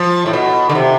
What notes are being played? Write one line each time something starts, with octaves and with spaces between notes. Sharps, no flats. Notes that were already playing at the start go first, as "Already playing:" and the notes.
Already playing: F3
A2
B2
D3
C3